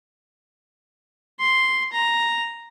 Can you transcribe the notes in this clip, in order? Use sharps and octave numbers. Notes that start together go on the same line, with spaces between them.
C6
A#5